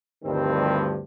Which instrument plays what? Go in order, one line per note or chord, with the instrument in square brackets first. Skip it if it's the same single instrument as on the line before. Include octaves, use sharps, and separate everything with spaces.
[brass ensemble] D2 G2 D#3 F3 G3 C4